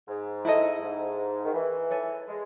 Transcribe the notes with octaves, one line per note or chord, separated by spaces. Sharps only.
G#2
E4 A4 D#5
G#2
D#3
E3
A4 C#5 G#5
G#3